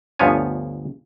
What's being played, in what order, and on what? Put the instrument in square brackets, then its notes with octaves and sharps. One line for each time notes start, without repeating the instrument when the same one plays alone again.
[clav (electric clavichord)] G1 D2 F3 B3 C#5 G#5